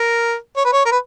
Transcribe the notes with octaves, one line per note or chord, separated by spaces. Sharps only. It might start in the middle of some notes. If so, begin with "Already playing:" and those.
Already playing: A#4
C#5
B4
C#5
A#4
B4